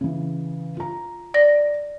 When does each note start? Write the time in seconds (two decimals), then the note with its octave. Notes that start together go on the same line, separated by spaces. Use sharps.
0.01 C#3 E3
0.77 F4 A#5
1.34 D5 A#6